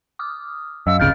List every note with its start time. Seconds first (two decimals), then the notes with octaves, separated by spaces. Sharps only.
0.19 D6 D#6 F6
0.87 F#2 D#5 F5 E6
1.00 D1 G1 C#3 F6 G6 A6 D7